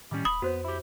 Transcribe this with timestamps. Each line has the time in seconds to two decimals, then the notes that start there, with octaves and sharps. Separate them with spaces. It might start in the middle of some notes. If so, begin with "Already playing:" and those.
0.11 A2 D#3 G3 C#4 D6
0.25 D#1 B5 D#6
0.42 F2 B3 F#4 C5 C#5
0.65 E4 G4